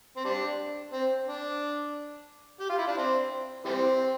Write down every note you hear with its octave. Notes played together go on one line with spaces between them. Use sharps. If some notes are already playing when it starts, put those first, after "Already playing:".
C4
G3 D4
C4
D4
G4
F4
E4
D4
C4
E3 G3 C4